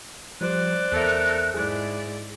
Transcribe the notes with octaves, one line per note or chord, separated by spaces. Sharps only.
F3 G3 C5 D5 F#6
E2 A4 A#4 E5
G#2 E4 G#4 D5